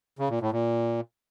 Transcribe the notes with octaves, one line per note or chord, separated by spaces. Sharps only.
C#3
A#2
A2
A#2